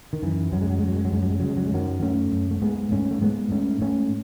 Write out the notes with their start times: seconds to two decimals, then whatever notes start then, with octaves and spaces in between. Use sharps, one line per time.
0.13 D#3
0.23 F#2 E3
0.52 F#2 F#3
0.61 G#3
0.70 F#3
0.79 G#3
0.83 F#2 F#3
0.96 G#3
1.05 F#3
1.12 F#2 G#3
1.22 F#3
1.31 G#3
1.40 C#3 F#3
1.49 G#3
1.57 F#3
1.66 G#3
1.72 F#2 D#3 F#3
2.02 F#2 A3 C#4
2.32 F#2
2.51 A3
2.62 G#2 G#3 B3
2.92 G#2 A3 C#4
3.11 A3
3.21 G#2 G#3 B3
3.51 G#2 A3 C#4
3.81 G#2 A3 C#4